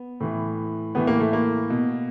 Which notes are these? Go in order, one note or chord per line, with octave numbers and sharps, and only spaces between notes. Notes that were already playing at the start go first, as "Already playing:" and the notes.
Already playing: B3
A2 E3
A2 E3 B3
A#3
A3
A#3
B2